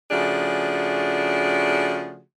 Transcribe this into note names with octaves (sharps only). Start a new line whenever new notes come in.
C#3 F3 A3 D4 F#4 G#4